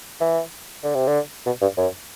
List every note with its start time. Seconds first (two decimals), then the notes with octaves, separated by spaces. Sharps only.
0.20 E3
0.83 D3
0.95 C3
1.07 D3
1.46 B2
1.61 G2
1.77 F#2